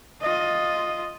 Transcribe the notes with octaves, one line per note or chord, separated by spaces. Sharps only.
F4 D#5